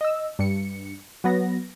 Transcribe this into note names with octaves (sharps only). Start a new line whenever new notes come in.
D#5 E6
G2 C#7
F#3 B3 A#6